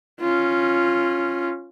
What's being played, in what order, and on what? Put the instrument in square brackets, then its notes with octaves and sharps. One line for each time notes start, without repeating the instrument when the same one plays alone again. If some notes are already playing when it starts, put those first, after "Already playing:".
[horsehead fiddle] C#4 F4